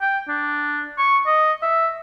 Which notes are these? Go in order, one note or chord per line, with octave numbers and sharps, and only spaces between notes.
G5
D4
C#6
D#5
E5